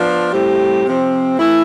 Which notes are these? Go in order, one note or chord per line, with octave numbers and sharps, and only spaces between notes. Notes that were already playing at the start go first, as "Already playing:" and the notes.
Already playing: F3 B3 D4 F4
A2 G3 C4 G4
C3 F3 C4
E3 A3 E4